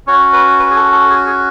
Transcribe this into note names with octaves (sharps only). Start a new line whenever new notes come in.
C#4 F#4 C#5
B4
B4
G#4
A4
A4
G#4
G#4